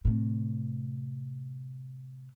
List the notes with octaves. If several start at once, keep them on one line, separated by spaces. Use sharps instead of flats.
A2 C3